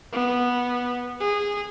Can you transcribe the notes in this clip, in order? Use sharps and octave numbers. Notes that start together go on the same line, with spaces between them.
B3
G#4